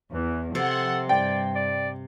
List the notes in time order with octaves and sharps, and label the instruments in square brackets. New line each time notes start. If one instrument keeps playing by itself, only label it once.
[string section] E2 [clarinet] E3
[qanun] C3 [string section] F3 F#5 C6 [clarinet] A4
[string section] G2 [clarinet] D5 [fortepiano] G5
[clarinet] D5